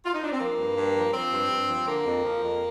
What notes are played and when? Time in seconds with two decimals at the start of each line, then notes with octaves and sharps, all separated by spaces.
0.05 F4
0.14 D#4
0.23 D4
0.32 C4
0.40 F3 A#3
0.58 G2
0.77 G2
0.95 F3
1.13 F3 C4
1.32 G2
1.50 G2
1.68 F3
1.87 D3 A#3
2.05 F2
2.24 F3
2.42 F2